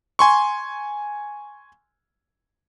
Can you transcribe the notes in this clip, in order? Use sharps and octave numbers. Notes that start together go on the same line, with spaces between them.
G#5 C6 C#6